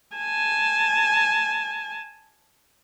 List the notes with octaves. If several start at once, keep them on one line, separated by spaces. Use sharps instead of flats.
G#5 A5